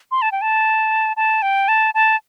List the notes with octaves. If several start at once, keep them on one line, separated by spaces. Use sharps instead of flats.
C6
A5
G5
A5
A5
G5
A5
A5